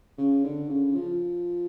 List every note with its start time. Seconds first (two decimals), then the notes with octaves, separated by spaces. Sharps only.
0.18 C#3
0.44 D3
0.69 C#3
0.95 F3